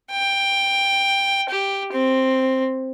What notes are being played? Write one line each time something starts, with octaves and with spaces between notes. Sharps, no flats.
G5
G4
C4